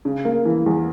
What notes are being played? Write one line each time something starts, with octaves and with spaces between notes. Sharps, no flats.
C#3
A#3
E3
E2